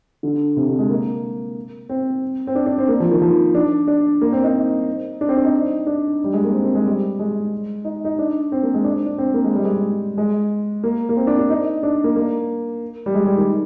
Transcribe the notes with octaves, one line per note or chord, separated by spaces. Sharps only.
D3
C3
D3
G#3
A#3
C4
C4
D4
D4
C4
A#3
F3
D#3
F3
D4
D4
A#3
C4
D#4
D4
C4
D4
D#4
D4
G3
G#3
A#3
C4
C4
G#3
G3
G#3
D#4
D#4
D4
C4
A#3
G#3
D4
D4
C4
A#3
G#3
G3
G#3
G#3
A#3
A#3
C4
D4
D4
D#4
D4
A#3
A#3
G3
G#3
G3
D#3